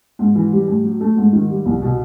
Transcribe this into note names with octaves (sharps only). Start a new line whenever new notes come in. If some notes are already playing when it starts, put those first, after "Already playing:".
G#2
E3
G3
A2
F#3
A3
G#2
D#3
G3
C2
B2